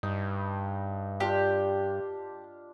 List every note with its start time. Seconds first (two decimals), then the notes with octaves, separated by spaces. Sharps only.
0.03 G2 D#4
1.20 D4 F4 G4 C6